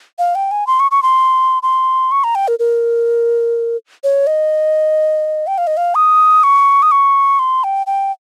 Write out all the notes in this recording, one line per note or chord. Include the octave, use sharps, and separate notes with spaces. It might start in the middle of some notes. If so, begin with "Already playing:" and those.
F5
G5
G#5
C6
C#6
C#6
C6
C6
C#6
A#5
G5
A#4
A#4
C#5
D#5
G5
F5
D#5
F5
D#6
C#6
D#6
C#6
C6
G5
G5